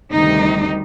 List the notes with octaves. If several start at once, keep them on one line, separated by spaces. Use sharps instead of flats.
D2 C3 D#3 G3 D#4